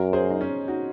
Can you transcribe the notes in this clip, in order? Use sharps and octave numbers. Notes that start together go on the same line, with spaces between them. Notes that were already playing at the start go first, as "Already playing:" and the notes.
Already playing: F#2 F#4 A#4
G#4 C5
D#4
C#4
D#4 F#4